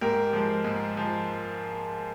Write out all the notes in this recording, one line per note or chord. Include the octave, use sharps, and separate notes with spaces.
G#2 G4 A#4
F3 G#3
G#2
F3 G#3